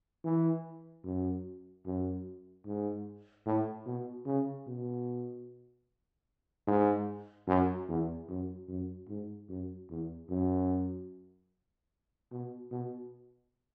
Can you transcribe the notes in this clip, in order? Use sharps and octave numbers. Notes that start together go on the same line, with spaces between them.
E3
F#2
F#2
G#2
A2
B2
C#3
B2
G#2
F#2
E2
F#2
F#2
G#2
F#2
E2
F#2
B2
B2